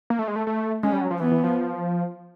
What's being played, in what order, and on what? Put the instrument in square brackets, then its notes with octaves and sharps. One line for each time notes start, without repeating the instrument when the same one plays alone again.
[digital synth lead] A#3
A3
G#3
A3
A3
[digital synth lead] G#3 [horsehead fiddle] C#4
[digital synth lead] G3
F#3
F3
[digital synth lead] E3 [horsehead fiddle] B3
[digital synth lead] E3
F3